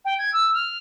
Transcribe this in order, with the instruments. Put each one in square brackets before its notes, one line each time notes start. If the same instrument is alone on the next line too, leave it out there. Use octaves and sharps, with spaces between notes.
[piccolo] G5
G#6
E6
F6